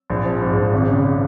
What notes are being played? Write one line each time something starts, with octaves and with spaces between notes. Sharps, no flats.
A#1
F3
G#2
A#1
G#1
C#3